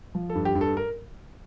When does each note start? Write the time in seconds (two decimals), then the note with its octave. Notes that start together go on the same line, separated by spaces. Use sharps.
0.15 F3
0.30 A4
0.35 G2
0.45 G4
0.55 G2
0.61 A4
0.77 A#4